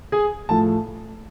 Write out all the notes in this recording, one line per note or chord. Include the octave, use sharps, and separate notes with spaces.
G#4 G#5
A2 F3 A3 A5